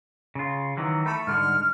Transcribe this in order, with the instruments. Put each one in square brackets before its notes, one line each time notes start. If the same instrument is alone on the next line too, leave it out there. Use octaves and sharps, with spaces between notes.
[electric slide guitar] C#3 F4
D#3 E3 F#3
[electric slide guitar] A3 A4 [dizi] B5
[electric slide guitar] G#2 D3 G3 [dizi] F6